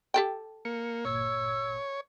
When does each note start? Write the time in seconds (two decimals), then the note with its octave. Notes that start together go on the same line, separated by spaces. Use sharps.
0.14 G4 A4 G5
0.65 A#3 C#7
1.05 G1 A#2 C#5 E6 G#6